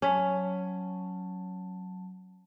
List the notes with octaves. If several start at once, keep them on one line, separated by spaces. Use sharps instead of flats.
F#3 C#4 A5